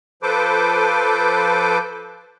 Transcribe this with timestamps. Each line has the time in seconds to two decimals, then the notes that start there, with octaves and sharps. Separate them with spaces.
0.23 F3 A4 B4 C5 D6